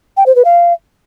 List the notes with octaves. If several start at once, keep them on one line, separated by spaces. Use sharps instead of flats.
G5
C5
B4
F5